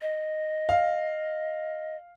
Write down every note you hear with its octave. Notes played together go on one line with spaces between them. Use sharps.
D#5
F5